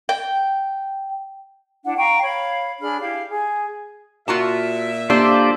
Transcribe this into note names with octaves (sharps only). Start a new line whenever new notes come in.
G5
D4 E4 F#5
F5 G5 A#5 C#6
C#5 F5 B5
D4 G#4 B5 F6
E4 G4 F5
G#4
A#2 F4 F#4 E5 A5
A#3 D4 F4 G4 A4 C5 D5